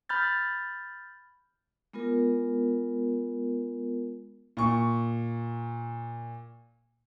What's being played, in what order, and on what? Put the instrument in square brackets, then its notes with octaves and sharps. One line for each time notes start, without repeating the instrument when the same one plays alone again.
[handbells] B5 F6 G6 A6
[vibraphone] G#3 B3 F4 A#4
[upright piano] A#2 C#6